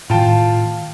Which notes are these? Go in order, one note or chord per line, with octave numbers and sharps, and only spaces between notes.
A2 D#3 F4 G5 A5